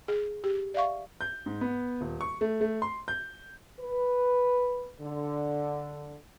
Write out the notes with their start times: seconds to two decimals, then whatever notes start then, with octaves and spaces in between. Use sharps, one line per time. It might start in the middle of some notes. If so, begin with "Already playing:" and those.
0.08 G#4
0.44 G4
0.74 D5 E5 F5 C#6
1.21 G6
1.46 G#2
1.61 B3
2.01 D#1
2.21 C#6
2.41 A3
2.61 A3
2.82 C6
3.08 G6
3.79 B4
5.01 D3